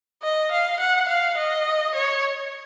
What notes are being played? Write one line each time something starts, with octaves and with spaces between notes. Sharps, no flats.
D#5
F5
F#5
F5
D#5
C#5